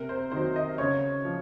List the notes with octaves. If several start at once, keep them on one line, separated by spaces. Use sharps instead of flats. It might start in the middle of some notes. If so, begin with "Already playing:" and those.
Already playing: C3 A#4
C5
D#3 F#3 C5
D#5
C#3 C#5
F3